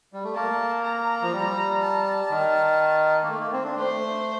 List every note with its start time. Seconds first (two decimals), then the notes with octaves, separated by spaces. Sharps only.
0.13 G3
0.24 A3
0.35 A#3 A5
0.83 A#5
1.22 F3
1.32 G3
1.81 A5
2.31 D#3
3.23 A#3
3.28 A3
3.40 A#3
3.53 C4
3.64 D4
3.77 A3 C5